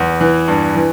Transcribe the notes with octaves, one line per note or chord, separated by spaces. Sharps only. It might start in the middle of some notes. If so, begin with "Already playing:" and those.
Already playing: E2
E3
G2
E3